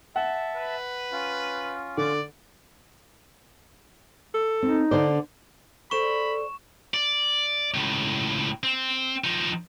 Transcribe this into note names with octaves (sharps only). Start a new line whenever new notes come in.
E5 F#5 A5
B4
C#4 F4
D3 D5
A4
C4 D#4
D3 D4 C5 D5
G#4 A4 C5 D5 B5 C#6 E7
D5
C#2 A2
C4
F3 D#4